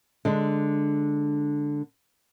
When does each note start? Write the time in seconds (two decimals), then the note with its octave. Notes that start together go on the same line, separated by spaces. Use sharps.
0.25 D3 G#3 D4